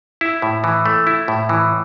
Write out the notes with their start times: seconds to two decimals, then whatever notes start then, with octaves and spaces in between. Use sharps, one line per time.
0.21 E4
0.42 A2
0.64 E3
0.86 A3
1.07 E4
1.28 A2
1.49 E3